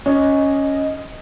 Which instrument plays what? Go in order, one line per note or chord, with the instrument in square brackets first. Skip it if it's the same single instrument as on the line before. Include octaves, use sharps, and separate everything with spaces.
[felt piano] C#4 [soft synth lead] D#5